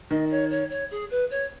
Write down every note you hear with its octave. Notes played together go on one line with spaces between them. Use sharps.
D#3 D#5
C#5
C#5
C#5
G#4
B4
C#5